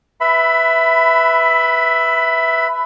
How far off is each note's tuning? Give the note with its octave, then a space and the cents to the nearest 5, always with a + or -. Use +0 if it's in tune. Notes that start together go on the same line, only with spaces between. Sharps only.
B4 +0 E5 +0 B5 +20